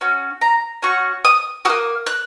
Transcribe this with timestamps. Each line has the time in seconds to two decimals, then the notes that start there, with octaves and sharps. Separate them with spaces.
0.01 C#4 F#4
0.41 A#5
0.82 C#4 F#4 C#6
1.25 D#6
1.65 A#3 F#4 D#6
2.06 F#6